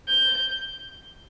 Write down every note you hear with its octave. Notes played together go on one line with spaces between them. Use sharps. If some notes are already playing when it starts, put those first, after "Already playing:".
G6